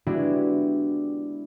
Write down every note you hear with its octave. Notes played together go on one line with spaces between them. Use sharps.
G#3 B3 D4 E4 F#4 G4